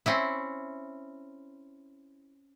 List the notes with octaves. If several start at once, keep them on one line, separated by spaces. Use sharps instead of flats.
C4 C#4 E4